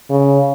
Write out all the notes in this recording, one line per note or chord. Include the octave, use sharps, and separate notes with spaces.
C#3